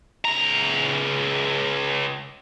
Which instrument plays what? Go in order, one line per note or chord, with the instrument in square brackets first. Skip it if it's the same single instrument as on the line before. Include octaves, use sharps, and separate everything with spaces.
[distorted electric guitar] C#2 A#5